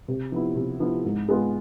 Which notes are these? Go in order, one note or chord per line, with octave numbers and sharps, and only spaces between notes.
C3
F3 B3 E4
C3
F3 B3 E4
G#2
G#3 B3 F4